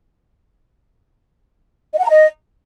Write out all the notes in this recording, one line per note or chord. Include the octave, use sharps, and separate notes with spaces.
D#5
F#5
A#5
D#5